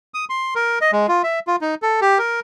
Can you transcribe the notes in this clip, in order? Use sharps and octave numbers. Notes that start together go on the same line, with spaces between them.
D#6
C6
A#4
D#5
G#3
F4
E5
F4
D#4
A4
G4
A#4